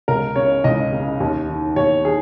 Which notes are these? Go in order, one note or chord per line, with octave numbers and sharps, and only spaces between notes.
C#2 A#4
C#3 C#5
C#2 D#5
C#3
D#2
D#3
D#2 C#5
D#3 G#4